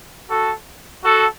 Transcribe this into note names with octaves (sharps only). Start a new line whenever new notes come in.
F#4 A4
F#4 A4